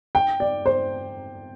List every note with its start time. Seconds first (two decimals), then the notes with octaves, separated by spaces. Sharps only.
0.15 G5
0.40 D5
0.66 C5